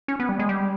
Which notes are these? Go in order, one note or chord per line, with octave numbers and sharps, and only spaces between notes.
C#4
B3
G3
G#3
G3